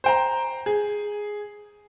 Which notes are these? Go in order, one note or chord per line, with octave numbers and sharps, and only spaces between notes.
C5 G5 A#5
G#4